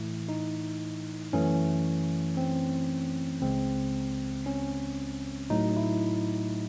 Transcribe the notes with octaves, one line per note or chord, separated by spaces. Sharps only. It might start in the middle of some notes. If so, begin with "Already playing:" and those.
Already playing: A2 E3 A3 E4
D#4
F#2 E3 A3 C#4
C4
C#2 C#3 G#3 C4
C#4
A2 F#3 A3 D#4
E4